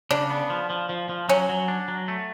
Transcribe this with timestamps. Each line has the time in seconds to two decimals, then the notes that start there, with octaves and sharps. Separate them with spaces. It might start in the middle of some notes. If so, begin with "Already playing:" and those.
0.11 C#3 D4
0.30 B3
0.50 F3
0.70 F3
0.89 F3
1.09 F3
1.29 F#3 C#4
1.49 F#3
1.68 D4
1.88 F#3
2.08 A3